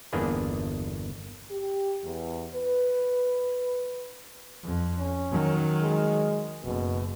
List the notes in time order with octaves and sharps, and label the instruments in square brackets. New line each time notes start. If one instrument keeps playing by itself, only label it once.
[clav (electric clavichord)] G1 E2 A#3 D4 G#4 B4
[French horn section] G4
E2
B4
[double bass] F2
[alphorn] C#4
[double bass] D#3 F#3
[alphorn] G#3
[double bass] F#1 [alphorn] B2